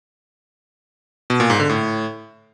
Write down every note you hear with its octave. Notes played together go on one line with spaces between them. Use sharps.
B2
A#2
G#2
D3
A2